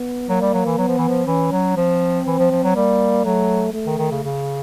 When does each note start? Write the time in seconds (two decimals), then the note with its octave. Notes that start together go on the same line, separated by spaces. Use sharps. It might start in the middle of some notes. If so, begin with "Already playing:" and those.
Already playing: B3
0.29 F#3 A#3
0.41 G3
0.54 F#3
0.65 E3
0.78 F#3 B3
0.88 F3
0.98 E3
1.08 F3
1.27 E3 C#4
1.52 F#3
1.77 F3 C4
2.27 E3
2.39 F3
2.51 F3
2.64 F#3
2.75 G3 A#3
3.25 F#3 A3
3.74 A3
3.86 D#3
3.98 D#3
4.11 C#3
4.24 C#3